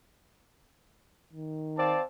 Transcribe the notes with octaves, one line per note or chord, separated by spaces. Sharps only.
D#3
C4 D5 F5 A5